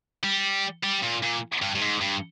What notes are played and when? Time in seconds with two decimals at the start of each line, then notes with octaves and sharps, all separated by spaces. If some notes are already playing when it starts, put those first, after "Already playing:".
0.24 G3
0.84 G3
1.03 A#2
1.23 A#2
1.62 G2
1.75 G2
1.81 G#2
2.01 G2